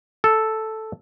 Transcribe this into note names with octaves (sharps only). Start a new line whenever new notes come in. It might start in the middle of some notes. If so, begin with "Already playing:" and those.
A4